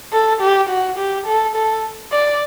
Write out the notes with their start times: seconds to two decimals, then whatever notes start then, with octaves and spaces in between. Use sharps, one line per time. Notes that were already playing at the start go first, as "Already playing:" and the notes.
0.13 A4
0.41 G4
0.69 F#4
0.98 G4
1.26 A4
1.55 A4
2.12 D5